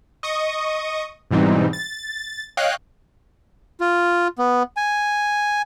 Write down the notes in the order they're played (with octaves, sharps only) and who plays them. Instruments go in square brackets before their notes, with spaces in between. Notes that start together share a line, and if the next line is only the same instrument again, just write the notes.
[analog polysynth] D#5 C#6 D#6
G#2 B2 E3 G3 C4 D#4
A6
C#5 D#5 F5 G5 F#6
[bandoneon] F4
B3
G#5